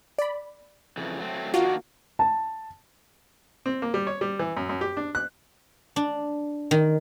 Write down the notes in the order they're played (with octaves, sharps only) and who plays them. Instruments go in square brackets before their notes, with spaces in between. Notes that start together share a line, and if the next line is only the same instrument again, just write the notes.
[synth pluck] D5 B5
[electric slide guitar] F2 C#3 E3
F#3 A3 C4
[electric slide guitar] D#3 A#3 D4 [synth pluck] F4 [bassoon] F#4
[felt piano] A5
[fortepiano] C4
A#3
G3
C#5
G3
E3
F#2
F#2
G4
D4
F#6
[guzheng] D4
D#3